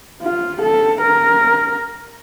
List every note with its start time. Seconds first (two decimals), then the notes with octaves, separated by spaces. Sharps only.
0.22 F4
0.62 A4
1.01 A#4